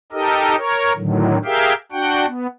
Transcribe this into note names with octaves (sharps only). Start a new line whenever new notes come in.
D#4 G4 A4 A#4 D#5
A#4 C#5
A2 D3 D#3 F#3
G4 G#4 A#4 E5 F5 G5
D4 F#4 F#5 G5
B3